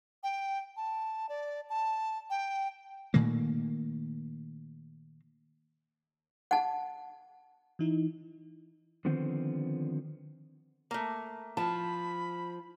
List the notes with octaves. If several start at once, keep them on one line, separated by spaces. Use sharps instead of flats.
G5
A5
D5
A5
G5
A#2 D#3 A3 A#3
F#5 A5
E3 D#4 E4
D3 D#3 F3 B3 C4 C5
A3 A#3
F3 A5 B5